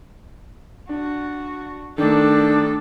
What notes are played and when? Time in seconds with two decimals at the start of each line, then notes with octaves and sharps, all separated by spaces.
0.89 D4 F#4
1.98 D#3 A3 D4 A4